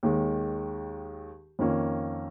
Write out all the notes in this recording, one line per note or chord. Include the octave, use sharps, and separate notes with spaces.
D#2 D#3 G#3
F2 D#3 A#3 C#4 F4